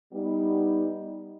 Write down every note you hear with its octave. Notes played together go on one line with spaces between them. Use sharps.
G3 B3 D#4